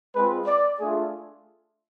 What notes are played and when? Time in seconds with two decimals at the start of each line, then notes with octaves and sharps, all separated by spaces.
0.15 G#3 C4 F4 B4
0.47 D5
0.80 A3 D4 F4 G#4